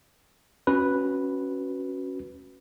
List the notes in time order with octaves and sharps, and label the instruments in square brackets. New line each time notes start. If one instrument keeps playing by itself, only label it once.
[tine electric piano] C#4 F#4 B4